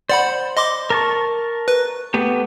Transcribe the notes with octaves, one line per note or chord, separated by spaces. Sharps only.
C5 D5 F#5 B5
D#5 C6 D6
A#4 A5 C#6
B4
A3 B3 G4